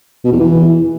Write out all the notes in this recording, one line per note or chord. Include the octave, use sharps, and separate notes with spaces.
B2
E2
E3